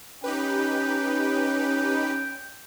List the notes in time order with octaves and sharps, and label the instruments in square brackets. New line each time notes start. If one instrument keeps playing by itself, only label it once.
[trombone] C#4 [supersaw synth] D#4 G4 B4 [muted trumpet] G5